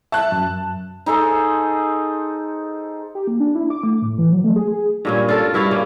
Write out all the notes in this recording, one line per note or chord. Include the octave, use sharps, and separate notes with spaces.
E5 A5 F#6
F#2
D#4 G#4 A4 C5
G4
A#3
D4
E4
D6
A3
A2
E3
F#3
A3
G#4
G#4
G2 A#2 C#4
F4 A4 A#4
G2 E4 F#4 F5
C#3 A#3